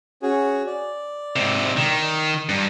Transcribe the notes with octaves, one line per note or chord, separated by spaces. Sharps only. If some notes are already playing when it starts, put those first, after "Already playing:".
C#4 F#4 G#4
D5
G#2 C3
D#3
G2 A#5